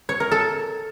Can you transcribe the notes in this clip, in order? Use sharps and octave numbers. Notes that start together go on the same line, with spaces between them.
C#5
A#4
A4